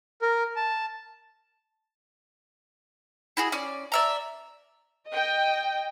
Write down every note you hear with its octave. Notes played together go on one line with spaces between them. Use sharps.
A#4
A5
E4 F#4 G#4
C#4 D5
D5 E5 A#5
D#5 G5